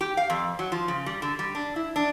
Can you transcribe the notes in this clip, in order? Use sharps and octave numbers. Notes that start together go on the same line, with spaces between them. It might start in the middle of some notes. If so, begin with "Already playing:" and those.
G4
F5
F2
F#3
F3
C#3
G3
D3
G3
D4
E4
D4